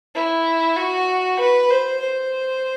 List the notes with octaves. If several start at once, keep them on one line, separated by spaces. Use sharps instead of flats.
E4
F#4
B4
C5
C5